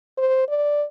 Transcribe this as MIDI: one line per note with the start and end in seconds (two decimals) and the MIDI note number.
0.18 0.47 72
0.49 0.84 74